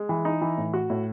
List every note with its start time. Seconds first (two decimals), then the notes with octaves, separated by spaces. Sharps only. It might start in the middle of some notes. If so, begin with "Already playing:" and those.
Already playing: G#3
0.09 E3
0.25 D#4
0.41 E3
0.57 A2
0.74 F#4
0.90 A2